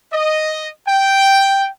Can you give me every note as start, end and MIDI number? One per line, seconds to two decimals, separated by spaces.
0.13 0.67 75
0.87 1.67 79